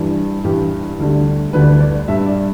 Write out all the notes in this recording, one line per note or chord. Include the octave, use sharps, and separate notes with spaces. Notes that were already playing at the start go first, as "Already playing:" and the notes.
Already playing: G2 E3 G3
G2 E3 G3 G4
D2 D3 G3
D2 D3 G3 B4
D5
B4
D5
G2 G3 E5
D5